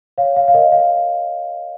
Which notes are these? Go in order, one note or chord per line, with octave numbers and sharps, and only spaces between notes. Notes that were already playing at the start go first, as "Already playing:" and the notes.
C#5 F5
F5
F5
A#4 D#5
F5